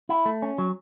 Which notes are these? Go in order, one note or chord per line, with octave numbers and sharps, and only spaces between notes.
E4
A3
C#4
F#3